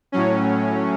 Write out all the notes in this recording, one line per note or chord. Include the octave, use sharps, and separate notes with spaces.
A2 F#3 C#4